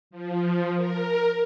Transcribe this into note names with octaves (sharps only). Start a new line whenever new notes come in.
F3
A#4